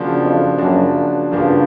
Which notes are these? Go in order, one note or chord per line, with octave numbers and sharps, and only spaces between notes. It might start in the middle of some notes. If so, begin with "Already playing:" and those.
Already playing: C#3 F3 A#3 D4 F#4
F2
F#2 C#3 F3 A#3 D4 F#4
G2 C#3 F3 A#3 D4 F#4